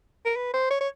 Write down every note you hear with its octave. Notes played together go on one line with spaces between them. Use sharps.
A#4
B4
C5
C#5
C#5